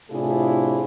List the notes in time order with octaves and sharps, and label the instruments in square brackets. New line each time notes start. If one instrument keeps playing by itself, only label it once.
[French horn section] A2 C3 D4 E4 F4 G#4